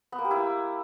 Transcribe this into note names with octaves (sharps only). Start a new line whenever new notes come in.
B3
A#3
G4
E4